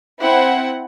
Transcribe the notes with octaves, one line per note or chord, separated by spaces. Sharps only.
C4 E4 F#5